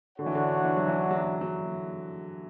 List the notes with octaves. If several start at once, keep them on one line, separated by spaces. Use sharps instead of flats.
D3 D4 F#4 C#5 F#5
E3
D3
E3
F#3
E3
F#3
F#3